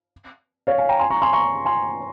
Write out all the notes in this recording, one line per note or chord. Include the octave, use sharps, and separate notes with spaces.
C#5 F5
F5 G#5
G5 A#5
G#5 C6
A#5 C#6
G#5 C6
A#5 C#6
G#5 C6